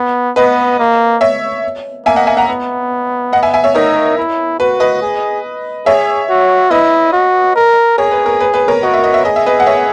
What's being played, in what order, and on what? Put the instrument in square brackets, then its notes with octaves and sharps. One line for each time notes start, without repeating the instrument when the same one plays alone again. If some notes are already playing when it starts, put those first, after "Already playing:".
Already playing: [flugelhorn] B3
[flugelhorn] B3 [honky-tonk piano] B4 D#5
[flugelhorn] A#3
[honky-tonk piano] C#5 E5
[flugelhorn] A#3 [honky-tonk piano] E5 G#5
[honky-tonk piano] D#5 F#5
E5 G#5
F#5 A#5
[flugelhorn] B3
[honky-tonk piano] D#5 F#5
E5 G#5
E5 G#5
C#5 E5
[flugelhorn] D#4 [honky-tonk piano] A#4 C#5
[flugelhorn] E4
[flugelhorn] F#4 [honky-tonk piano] B4
[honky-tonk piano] B4 D#5
[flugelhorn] G#4
[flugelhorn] G#4 [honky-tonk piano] C#5 E5
[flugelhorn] F#4
[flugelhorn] E4 [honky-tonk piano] B4 D#5
[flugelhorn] F#4
A#4
[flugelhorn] G#4 [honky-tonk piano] A#4 C#5
[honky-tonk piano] B4
A#4
B4
B4
A#4 C#5
[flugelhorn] F#4 [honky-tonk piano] D#5
[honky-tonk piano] E5
D#5
E5
[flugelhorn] G#4 [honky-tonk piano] D#5
[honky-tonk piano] E5
B4 D#5
F#5
C#5 E5